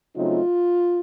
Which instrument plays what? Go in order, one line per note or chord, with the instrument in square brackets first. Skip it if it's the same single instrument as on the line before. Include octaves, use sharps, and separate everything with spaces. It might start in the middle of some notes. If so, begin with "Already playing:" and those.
[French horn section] C#3 F#3 A3 C4 D#4 F4